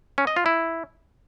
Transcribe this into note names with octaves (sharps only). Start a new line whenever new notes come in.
C#4
D#5
F4
E4